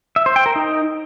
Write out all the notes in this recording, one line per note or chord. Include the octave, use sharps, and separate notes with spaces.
E5
C5
G5
A#4
D#4